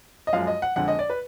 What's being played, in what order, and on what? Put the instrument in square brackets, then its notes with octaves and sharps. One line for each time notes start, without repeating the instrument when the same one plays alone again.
[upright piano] D#5
F#2 F3 G#3 F5
D#5
F#5
F2 D3 G#3 F#5
D#5
D5
B4